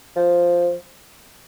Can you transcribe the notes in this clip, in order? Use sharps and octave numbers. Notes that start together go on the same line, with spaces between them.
F3